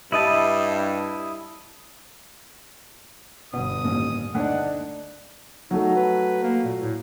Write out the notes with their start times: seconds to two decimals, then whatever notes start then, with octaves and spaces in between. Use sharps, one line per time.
0.12 G2 E4 D#5 A5
3.53 G1 B2 D#6
3.85 A1 D#2
4.34 D2 D4 D#4 F#5
5.71 F#3 A3 D#4
5.96 B4
6.43 A#3
6.64 A#2
6.80 A2